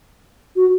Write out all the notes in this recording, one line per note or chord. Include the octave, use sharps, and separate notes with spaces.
F#4